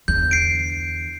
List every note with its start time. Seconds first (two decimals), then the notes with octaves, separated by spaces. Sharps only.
0.08 E2 D3 G6
0.31 C7 D7